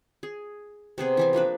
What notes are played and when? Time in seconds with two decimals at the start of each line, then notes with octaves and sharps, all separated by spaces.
0.23 G#4
0.98 C3 B3 G#4 C5
1.17 E3 E4 G#5
1.33 F3 A#3 D4 B4